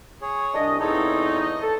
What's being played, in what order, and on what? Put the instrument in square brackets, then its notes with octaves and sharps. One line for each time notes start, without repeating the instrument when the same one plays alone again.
[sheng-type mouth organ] G#4 C#5
[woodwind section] C2 D4 D#5
[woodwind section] E2 D#4 [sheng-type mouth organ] C4 A4 C#5
[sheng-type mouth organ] D#5
[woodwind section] A4